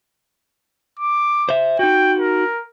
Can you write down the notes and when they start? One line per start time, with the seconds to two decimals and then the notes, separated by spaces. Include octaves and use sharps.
0.99 D6
1.49 C5 E5
1.79 D#4 F#4 G5
2.19 A#4